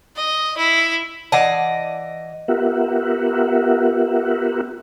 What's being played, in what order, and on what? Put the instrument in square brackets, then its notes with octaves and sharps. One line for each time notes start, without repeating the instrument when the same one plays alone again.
[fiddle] D#5
E4
[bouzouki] E3 D5 D#5 [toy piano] F#5 A5
[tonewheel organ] B3 F4 G4 A#4 E5 F#5